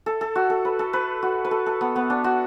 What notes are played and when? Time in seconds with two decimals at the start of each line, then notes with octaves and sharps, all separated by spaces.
0.06 A4
0.21 A4
0.35 F#4
0.50 A4
0.65 B4
0.79 A4
0.93 B4
1.22 F#4
1.45 B4
1.51 A4
1.66 A4
1.81 B3
1.96 B3
2.10 D4
2.24 F#4